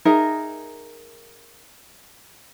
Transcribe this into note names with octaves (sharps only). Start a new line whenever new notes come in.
D#4 G#4 A#4 E5